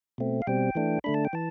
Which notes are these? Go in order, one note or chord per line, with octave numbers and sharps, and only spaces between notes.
B2 A3 C4
F5
B2 G3 C4 G5
E3 A3 D4
D3 A3 D4 B5
A5
G5
E3 A5